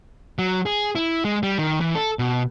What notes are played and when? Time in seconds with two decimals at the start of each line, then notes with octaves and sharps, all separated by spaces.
0.39 F#3
0.66 G#4
0.95 E4
1.25 G#3
1.43 G3
1.58 D#3
1.81 E3
1.95 A4
2.19 B2